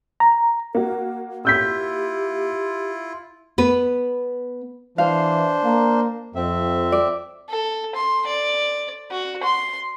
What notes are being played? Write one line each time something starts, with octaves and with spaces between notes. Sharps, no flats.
A#5
A#3 F#4 A#4
E4 F4 G4 E6 G6 B6
B3 B4
E3 D4 C5 F5
A#3
F2 C4 E5
D5
A4
C6
D5
F#4
C6